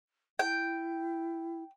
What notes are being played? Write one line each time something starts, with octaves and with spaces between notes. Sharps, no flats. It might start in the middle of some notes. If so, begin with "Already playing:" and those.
E4 G5